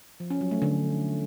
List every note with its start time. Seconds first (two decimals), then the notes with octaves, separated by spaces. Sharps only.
0.20 F3
0.30 C#4
0.41 F#3
0.51 A3
0.62 D3